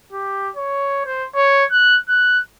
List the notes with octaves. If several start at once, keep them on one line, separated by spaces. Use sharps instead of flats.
G4
C#5
C5
C#5
F#6
F#6